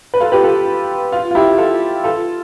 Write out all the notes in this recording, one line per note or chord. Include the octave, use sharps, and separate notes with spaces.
B4
F4 A4
G4 B4
F4 A4
F4
F4
E4 G4
F4 A4
F4 A4